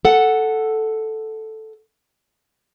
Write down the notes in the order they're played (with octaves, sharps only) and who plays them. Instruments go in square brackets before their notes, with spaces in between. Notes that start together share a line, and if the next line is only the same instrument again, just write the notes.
[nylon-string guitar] A4 F#5